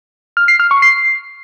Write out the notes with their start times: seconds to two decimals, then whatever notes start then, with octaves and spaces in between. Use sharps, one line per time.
0.37 F6
0.48 C7
0.60 F6
0.71 C#6
0.82 C7